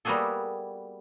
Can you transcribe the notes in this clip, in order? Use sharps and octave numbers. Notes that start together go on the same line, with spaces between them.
G3 A#3 B3 F#4 G#4 A4